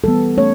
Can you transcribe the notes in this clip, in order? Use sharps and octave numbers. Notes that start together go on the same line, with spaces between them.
E3 G3 B3 A4
A3 C#4 C#5